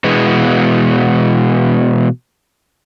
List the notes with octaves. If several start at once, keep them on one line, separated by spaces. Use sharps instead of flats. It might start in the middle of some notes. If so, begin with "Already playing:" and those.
B2 E3 G#3 B3